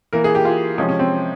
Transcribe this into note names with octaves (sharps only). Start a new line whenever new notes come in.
E3 A#3 A#4
G#4
G4
F4
C3 F3 G#3 C#4
C#4
C4